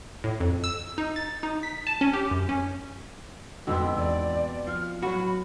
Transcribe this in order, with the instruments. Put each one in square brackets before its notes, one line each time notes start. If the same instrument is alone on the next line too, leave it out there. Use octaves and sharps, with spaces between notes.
[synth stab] A2
F2
E6
D#4
A6
D#4
B6
A5
C#4
G4
F#2
C#4
[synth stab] F2 D3 [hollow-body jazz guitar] G#2 [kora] B2 B3 C4 [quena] E6
[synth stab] E2 [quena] D5
[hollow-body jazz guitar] F3 [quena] F6
[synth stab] A2 F#3 [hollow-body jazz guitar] F#4 [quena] B5